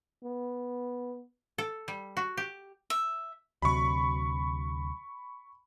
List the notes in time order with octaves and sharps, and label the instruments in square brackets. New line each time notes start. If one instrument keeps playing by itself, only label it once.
[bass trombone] B3
[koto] A4
G3
F#4
G4
[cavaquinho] E5
[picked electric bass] D2 C3 F#3 [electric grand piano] B5 C#6